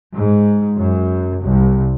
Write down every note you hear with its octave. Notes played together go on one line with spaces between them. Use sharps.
G#2
F#2
C2